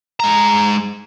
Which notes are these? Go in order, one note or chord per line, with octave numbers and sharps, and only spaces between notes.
G#3 A#5